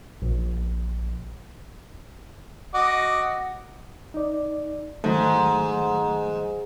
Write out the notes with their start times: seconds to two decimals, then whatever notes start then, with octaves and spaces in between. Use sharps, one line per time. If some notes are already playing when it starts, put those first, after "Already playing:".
0.22 A#1
2.74 F#4 D#5 D6
4.14 D#4 D5
5.04 G#2 D#3 F#3 A3